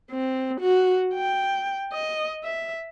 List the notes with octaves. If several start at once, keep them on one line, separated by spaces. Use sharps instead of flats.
C4
F#4
G5
D#5
E5